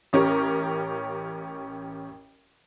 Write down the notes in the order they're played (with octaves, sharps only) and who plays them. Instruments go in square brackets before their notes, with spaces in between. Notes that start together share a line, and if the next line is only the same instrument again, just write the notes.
[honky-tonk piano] A1 C#4 G4 A#4 C#6